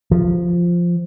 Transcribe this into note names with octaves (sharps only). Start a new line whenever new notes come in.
F3